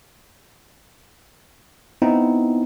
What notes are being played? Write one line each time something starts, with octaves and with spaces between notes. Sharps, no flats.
B3 C4 D#4 E4